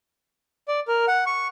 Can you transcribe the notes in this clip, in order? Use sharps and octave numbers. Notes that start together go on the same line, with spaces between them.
D5
A#4
F#5
C#6